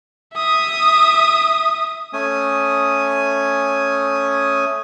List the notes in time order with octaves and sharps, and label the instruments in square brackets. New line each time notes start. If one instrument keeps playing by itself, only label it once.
[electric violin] E5 D#6
[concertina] A3 C#4 G#5 D#6